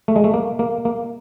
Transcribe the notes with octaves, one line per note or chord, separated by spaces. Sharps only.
A3
G#3
A3
A#3
A#3
A#3